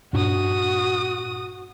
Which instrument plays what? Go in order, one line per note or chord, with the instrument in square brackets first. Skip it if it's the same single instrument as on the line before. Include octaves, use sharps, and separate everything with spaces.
[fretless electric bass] G2 A#2 D4 [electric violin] F#4 D#6